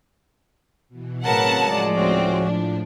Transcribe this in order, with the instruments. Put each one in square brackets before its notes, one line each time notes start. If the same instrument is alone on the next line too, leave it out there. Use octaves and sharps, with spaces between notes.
[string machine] B2 E3
[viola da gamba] A2 A#4 B4 [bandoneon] C#3 F#3 [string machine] C4 [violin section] F#5 A5
[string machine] A2 F3 [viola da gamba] G#3 D5
[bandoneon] D2 C#4 F#4 [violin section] C4
[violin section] D4